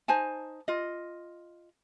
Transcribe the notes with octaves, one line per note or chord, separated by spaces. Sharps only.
D#4 C5 G#5 A5
F4 D#5